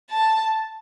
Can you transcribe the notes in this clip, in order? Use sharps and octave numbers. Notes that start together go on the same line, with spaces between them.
A5